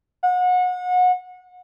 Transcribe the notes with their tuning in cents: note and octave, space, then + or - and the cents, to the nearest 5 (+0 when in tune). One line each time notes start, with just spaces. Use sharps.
F#5 -30